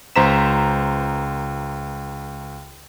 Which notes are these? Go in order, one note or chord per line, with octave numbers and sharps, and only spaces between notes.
C#2 C5 A#5 B6 E7